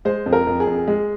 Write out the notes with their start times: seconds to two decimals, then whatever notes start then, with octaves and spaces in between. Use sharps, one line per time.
0.05 G#3 C5
0.26 F2
0.33 A#4
0.47 F2
0.60 G#4
0.67 F2
0.88 G#3